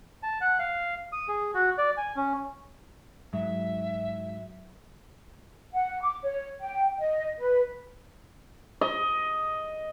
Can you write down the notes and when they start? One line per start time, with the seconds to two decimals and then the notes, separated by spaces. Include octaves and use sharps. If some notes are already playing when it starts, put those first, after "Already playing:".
0.23 A5
0.41 F#5
0.59 F5
1.12 D#6
1.28 G#4
1.54 F#4
1.78 D5
1.97 G#5
2.16 C#4
3.33 G#2 F#3 E5
5.73 F#5
6.01 D6
6.23 C#5
6.60 G5
6.99 D#5
7.39 B4
8.81 D#5